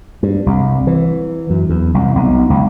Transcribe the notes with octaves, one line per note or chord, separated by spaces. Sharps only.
G2
C2
E3
F#2
E2
C2
B1
C#2